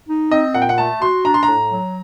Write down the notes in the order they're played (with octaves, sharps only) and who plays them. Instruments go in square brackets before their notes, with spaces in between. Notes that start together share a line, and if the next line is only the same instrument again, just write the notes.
[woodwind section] D#4
[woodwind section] C4 [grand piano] D#5
[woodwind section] A#2 [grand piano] F#5
[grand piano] G5
F#5
[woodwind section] A3 [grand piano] A5
[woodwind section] F#4 [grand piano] C6
[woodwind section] D4 [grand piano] A#5
[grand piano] C6
A#5
[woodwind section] A2
F#3